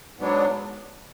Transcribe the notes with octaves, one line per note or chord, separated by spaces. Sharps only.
G#2 F#3 B3 D4